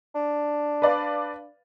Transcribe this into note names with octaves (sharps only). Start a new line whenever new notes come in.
D4
B4 D5 F5